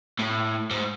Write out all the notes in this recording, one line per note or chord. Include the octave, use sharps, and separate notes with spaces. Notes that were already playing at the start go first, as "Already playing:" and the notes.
A2
G#2